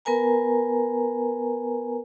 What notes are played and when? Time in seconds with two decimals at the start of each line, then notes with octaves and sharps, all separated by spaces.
0.05 B3 A#4 B4 G#5 A#5